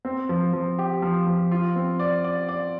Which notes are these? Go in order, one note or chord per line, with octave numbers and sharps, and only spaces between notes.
C4
F3
F3
G4
F3
F3
F4
C4
D5
D5
D5